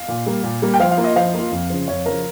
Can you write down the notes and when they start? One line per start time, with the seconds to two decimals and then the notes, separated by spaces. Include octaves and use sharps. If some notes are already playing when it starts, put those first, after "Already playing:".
Already playing: F5
0.08 A#2
0.26 G3 A#3
0.43 A#2
0.62 G3 A#3
0.74 G5
0.80 F3 F5
0.91 F5
0.97 A#3 F4
1.04 D#5
1.16 F3 F5
1.34 A#3 F4
1.51 F2
1.70 C#3 F3
1.88 F2 C#5
2.06 C#3 F3 A#4